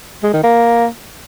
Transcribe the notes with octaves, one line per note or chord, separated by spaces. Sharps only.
G#3
D#3
A#3